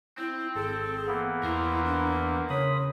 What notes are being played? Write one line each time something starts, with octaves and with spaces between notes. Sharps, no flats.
C4 E4
G#1 G#4 A4
E3 A#3 B3
E2 E4 A#4 C5
D4
C#3 C#5 B5 D#6